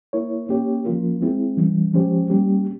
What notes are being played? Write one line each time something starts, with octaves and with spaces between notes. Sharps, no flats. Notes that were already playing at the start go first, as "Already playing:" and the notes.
A#3 E4 A#4 C#5
A#3 C#4 G4 C#5
F3 A#3 C#4 F4 A#4
G#3 C4 E4 G#4
E3 G3 C#4
F3 G#3 C#4 G4 C5
G3 A#3 C#4 G4